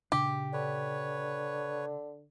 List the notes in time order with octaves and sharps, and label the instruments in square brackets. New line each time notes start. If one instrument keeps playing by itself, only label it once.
[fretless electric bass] A#2 C#3 D4 [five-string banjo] G4
[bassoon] D3 [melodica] B4 C#5